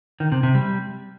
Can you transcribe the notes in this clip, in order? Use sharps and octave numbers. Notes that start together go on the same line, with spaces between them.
D#3
C3
C3
G3